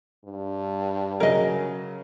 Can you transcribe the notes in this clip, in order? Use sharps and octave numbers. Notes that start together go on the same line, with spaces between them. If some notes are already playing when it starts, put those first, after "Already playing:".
G2
C#3 F#3 C#4 A#4 D#5